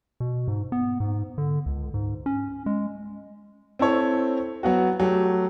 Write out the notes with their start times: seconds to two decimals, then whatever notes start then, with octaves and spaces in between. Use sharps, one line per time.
0.20 B2
0.48 G#2
0.72 B3
1.00 G#2
1.38 D3
1.66 C#2
1.94 G#2
2.26 C#4
2.66 G#3
3.79 C4 E4 A4 C#5
4.63 F#3 B3 F#4
5.00 F#3 A3 G4